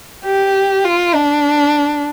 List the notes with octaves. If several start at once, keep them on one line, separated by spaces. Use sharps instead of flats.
G4
F4
D4